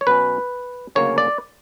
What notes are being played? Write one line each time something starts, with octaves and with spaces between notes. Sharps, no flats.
C#5
B2 F#3 C#4 B4
D2 C#3 F#3 A#3 C#4 C#5
D5